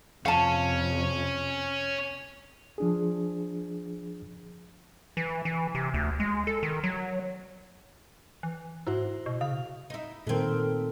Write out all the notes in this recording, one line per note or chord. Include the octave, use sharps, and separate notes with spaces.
F2 C3 C#4 F5 A5
F3 D4 G#4
E3
E3
C3
D2
G#3
A4
D#3
F#3
E3
G#2 E4 F#4 C5
B2
C#3 F5
D#4 E4
A#2 D#3 A3 C4 A#4